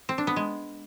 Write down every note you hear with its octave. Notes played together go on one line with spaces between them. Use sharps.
C4
D4
B3
G#3